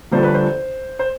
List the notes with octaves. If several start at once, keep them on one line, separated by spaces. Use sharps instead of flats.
G1 G2 F3 A3 C5
B4
C5
C5